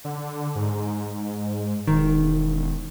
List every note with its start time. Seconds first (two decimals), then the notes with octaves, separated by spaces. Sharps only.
0.05 D3
0.55 G#2
1.87 E1 D#3